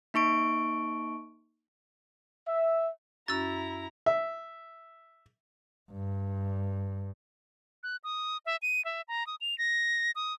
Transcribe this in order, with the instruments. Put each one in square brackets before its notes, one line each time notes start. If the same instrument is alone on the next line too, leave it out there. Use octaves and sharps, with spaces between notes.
[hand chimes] A#3 D#4 C#6 D7
[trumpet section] E5
[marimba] F#2 C#4 F#4 [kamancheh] E4 A#5 [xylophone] E6 A6
[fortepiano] E5
[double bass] G2
[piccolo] F#6
D#6
E5
D#7
E5
A#5
D#6
F7
A#6
D#6